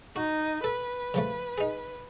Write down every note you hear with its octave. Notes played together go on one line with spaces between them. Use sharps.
D#4 F#4
A4 B4
C#3 F3 A3
D#4 G#4